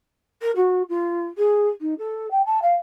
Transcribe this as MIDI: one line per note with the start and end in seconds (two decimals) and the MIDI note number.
0.41 0.51 70
0.56 0.82 66
0.89 1.27 65
1.38 1.68 68
1.81 1.94 63
1.98 2.29 69
2.31 2.45 79
2.45 2.60 81
2.62 2.74 77